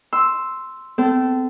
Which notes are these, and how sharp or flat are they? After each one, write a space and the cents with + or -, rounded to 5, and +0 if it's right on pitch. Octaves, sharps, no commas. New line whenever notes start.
C6 +0 E6 +0
C4 -35 A4 +0